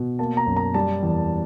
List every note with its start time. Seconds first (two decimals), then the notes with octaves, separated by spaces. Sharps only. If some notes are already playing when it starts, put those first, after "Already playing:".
Already playing: B2
0.19 A#3 A5
0.37 A#5
0.46 F#2
0.57 A#5
0.74 G3 A5
1.02 E2